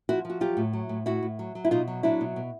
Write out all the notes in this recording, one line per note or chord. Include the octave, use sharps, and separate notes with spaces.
F3 E4 F#4
F3 F#4
F#3 F4 G4
A2
F#3
A2
A2 E4 F#4
A2
F#3
F#3
E4
B2 D#4 F4
F#3
F#3 D4 E4
B2
B2